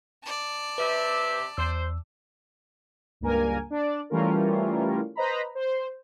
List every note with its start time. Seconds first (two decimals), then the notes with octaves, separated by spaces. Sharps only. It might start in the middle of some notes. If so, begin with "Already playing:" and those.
0.23 D5 A5
0.78 C3 G4 B4 E5
1.57 E2 C5 E6
3.21 C#2 G2 A#3 A#4 G#5
3.70 D4 D5
4.10 E3 G3 A3 C#4 F4 A#4
5.15 B4 C5 D#5 A#5 B5
5.55 C5